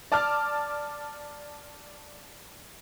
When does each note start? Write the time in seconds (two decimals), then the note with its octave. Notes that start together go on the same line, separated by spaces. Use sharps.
0.12 D5 A5 D6 F6